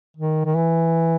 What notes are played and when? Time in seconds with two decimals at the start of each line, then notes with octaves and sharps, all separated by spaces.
0.17 D#3
0.45 D#3
0.55 E3